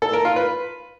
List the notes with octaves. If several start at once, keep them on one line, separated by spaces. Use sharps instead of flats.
A4
A#4
F4
B4